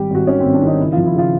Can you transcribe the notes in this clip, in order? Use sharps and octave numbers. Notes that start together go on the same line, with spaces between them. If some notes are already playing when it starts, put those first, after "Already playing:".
Already playing: G#1 G3 G4
G#1 F#4
D#3 C#4
C4
G#1
D4
D#3 D#4
C#3 E4
F4
F3
E4
C#3 F4